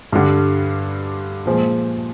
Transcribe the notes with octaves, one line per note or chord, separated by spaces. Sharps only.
G2 D3 G3
A#2 F3 G#3